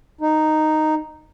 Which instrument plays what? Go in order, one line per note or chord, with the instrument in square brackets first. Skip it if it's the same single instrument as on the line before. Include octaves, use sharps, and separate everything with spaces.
[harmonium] D#4